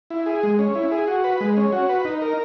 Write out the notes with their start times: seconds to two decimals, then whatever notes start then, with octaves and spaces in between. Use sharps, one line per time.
0.10 E4
0.26 G#4
0.43 G#3
0.59 C#4
0.75 E4
0.92 G#4
1.07 F#4
1.24 B4
1.41 G#3
1.57 C#4
1.73 F#4
1.89 B4
2.05 D#4
2.22 A#4